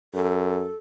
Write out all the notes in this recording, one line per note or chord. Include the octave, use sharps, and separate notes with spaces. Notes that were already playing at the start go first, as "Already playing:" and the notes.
F#2 A4